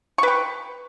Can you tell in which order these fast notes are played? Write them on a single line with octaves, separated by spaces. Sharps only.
C#6 B4 G5